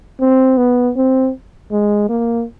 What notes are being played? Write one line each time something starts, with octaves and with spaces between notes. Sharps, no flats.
C4
B3
C4
G#3
A#3